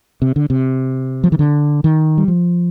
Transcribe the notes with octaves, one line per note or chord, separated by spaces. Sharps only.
C3
D3
C3
F3
D#3
D3
D#3
G3
F3